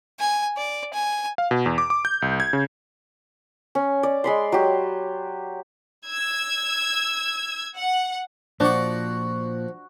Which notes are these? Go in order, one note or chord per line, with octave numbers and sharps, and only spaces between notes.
G#5
D5
G#5
F5
B2
E2
D6
D6
G6
C2
G#6
C#3
C#4
D5
G#3 B5 C6
F#3 G4
E6 G#6
F#5
A#2 F3 D4 F#4 F#5